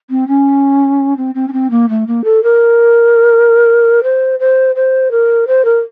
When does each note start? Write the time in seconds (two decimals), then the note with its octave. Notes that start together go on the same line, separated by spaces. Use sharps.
0.10 C4
0.28 C#4
1.17 C4
1.35 C4
1.48 C#4
1.53 C4
1.71 A#3
1.89 A3
2.07 A#3
2.24 A4
2.43 A#4
4.03 C5
4.40 C5
4.76 C5
5.11 A#4
5.47 C5
5.65 A#4